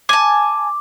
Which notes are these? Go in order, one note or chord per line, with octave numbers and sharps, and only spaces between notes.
G#5 A5 D6